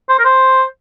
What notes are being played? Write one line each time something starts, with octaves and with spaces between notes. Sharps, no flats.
C5
A#4
C5